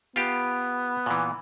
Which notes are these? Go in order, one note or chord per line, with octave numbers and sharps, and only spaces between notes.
B3 F4 G4
A#2 E3